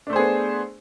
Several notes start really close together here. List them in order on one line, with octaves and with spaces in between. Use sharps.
D4 A3 C5 G#4 B3